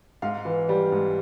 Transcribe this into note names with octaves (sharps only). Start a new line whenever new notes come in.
G#2 F5
E3
G3
G#2